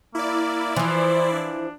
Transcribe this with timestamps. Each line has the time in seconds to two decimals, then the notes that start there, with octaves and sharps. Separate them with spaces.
0.15 A#3 E4 D5
0.76 E3 F3 C5
1.32 D4